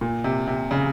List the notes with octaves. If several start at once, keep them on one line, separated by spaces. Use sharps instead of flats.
A#2
C3
C3
C#3